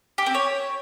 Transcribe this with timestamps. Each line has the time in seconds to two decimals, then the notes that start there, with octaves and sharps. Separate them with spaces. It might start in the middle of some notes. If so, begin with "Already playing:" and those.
0.18 G4
0.26 C4
0.34 C#5